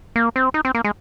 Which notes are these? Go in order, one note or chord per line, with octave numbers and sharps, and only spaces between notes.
A#3
C4
D#4
C4
A#3
G#3